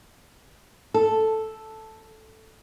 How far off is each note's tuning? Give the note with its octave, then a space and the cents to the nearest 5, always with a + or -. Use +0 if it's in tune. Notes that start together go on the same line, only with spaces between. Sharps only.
A4 +0